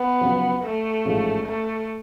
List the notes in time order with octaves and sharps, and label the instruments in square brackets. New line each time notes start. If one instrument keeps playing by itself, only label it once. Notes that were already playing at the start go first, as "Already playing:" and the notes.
Already playing: [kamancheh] B3
[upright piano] F#1 F#2 F3
[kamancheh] A3
[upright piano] A1 G#2 F3 G#3
[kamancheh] A3